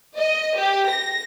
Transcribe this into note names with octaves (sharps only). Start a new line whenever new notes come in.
D#5
G4
A#6